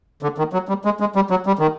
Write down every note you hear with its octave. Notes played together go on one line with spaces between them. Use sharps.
D3
D#3
F#3
G3
G#3
G#3
G3
F#3
G3
D#3